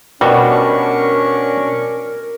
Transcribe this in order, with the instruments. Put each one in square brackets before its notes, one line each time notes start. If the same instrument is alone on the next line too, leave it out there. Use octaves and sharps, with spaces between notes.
[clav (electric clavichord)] B2 F#4 [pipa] G3 [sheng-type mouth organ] C#4 D4 C#6 [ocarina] A#4